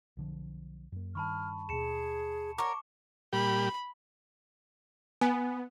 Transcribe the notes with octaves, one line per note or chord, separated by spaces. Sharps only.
B1 D3 F3
F#2 A#3
G2 D#3 A5 B5 C#6 F6
D#2 B2 G#4 A5 C#7 E7
A#4 C#5 F#5 C#6 D6
A#2 G3 G4 B5
B3 G#5